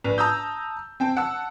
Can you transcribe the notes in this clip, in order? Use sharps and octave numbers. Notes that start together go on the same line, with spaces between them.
A#1 B4 F7
A5 A#5 D#6 E6 G6
C4 G5 A5
F#5 A5 E6